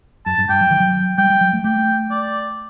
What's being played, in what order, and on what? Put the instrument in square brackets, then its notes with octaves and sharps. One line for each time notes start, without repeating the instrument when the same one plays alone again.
[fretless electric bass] F#2 [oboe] A5
[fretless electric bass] G2
[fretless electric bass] G2 [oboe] G5
[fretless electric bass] F#3
D#3
F#3
[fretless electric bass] G3 [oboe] G5
[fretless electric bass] G3
F#3
A3
[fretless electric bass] A3 [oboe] G5
[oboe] D5